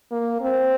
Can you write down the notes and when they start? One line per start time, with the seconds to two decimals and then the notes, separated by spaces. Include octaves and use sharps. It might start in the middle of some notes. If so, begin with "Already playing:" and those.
0.11 A#3
0.41 C4